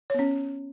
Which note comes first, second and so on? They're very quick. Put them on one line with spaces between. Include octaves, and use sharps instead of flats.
C#5 B3 C#4